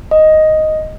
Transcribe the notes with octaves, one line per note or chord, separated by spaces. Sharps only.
D#5